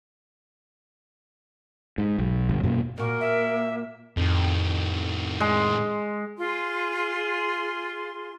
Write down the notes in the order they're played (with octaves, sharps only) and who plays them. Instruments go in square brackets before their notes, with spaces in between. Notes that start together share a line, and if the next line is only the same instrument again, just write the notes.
[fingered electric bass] G#2
B1
G1
F#2 B2 A3 A#3
[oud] A#2 F#4 [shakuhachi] A#3 [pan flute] A#4
[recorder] E5
[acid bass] F2 [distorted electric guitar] A2 D#3
[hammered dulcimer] G#3
[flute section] F4 G#4 C6